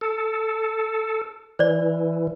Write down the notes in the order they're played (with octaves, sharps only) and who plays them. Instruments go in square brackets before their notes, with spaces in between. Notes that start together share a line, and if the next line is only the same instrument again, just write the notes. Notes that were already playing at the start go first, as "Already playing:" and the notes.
[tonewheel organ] A4
[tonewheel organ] E3 [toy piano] C5 D5